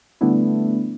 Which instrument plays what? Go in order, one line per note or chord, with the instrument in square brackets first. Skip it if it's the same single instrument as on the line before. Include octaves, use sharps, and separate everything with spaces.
[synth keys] D3 G3 A3 B3 D4 E4